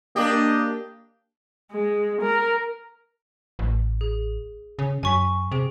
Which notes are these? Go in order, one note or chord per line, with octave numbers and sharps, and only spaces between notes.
A#3 D4 G4 D#5
G#3
A#4
A1
G#4
C#3
F#2 G#5 C#6 B6
C3 G#4 D7